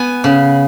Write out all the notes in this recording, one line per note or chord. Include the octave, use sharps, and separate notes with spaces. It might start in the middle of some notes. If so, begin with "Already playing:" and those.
Already playing: B3 G#5
C#3